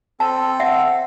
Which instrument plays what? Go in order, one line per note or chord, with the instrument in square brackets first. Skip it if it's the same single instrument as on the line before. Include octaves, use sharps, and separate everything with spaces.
[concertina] C4 A4 [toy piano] A5
[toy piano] E5 F#5